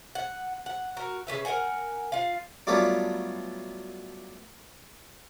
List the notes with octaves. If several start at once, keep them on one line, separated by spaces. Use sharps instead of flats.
F#5
F#5
F#4 A#4
C#3 A3 B4 E5
A#4 C5 F#5 G#5
F4 F5
F#3 G3 A3 B3 D4 F4